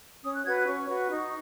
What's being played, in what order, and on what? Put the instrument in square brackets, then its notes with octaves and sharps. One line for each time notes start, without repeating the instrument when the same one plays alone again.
[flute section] C#4 D#6
F#6
F#4 B4 G#6
F#6
C#4 C#6
F#4 B4
D#4